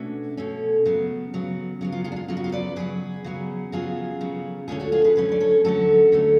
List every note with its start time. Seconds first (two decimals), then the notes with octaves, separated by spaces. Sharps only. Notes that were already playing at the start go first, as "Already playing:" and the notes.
Already playing: B2 A3 C#4 D4 F#4
0.37 B2 A3 C#4
0.86 C#3 F#3 B3
1.34 C#3 F#3 B3
1.81 C#3 F#3 B3
1.92 F4
2.04 F4 G#4
2.12 D4
2.16 F4
2.28 C#3 F#3 B3 F4
2.37 F#4
2.44 F4
2.52 B4 D5
2.76 C#3 F#3 B3 G#4 B4
3.24 C#3 F#3 B3
3.72 C#3 F#3 B3 F4 G#4
4.21 C#3 F#3 B3
4.68 D2 D3 F#3 A3 C#4 F4 G#4
4.80 D4 F#4
4.92 F4 G#4
5.04 G#4 B4
5.16 D2 D3 F#3 A3 C#4 G#4 B4
5.32 D5
5.40 A4 C#5
5.65 D2 D3 F#3 A3 C#4 F#4 A4
6.12 D2 D3 F#3 A3 C#4